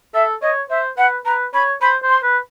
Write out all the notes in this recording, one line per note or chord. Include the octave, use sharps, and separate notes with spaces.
A4 E5
C#5 D#5
C5 E5
B4 F#5
B4 A#5
C#5 B5
C5 B5
C5
C6
B4